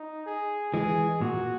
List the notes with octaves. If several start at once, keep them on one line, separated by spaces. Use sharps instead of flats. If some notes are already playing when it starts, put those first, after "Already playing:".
Already playing: D#4
G#4
E3 G#3 G#4
A#2 F#4